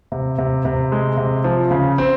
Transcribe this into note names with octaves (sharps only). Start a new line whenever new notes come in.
C3
C3
C3
G#3
C3
F3
C#3
C4